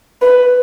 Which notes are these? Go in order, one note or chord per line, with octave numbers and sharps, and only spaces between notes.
B4